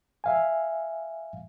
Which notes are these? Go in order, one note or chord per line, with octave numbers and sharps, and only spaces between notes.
E5 F5 G#5